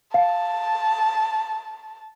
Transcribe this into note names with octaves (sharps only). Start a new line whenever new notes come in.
F5 A5